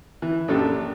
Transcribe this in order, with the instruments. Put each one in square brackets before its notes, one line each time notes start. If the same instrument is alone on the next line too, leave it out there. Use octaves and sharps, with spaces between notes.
[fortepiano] E3
A#1 F#2 D4 G4 A4